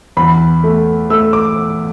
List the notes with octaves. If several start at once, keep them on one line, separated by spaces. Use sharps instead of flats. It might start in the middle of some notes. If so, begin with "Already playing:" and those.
E2 B5
A3
A3 E6
D6